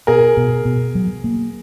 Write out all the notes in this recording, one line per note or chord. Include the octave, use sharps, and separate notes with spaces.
B2 G#4 A#4
B2
B2
F#3
A#3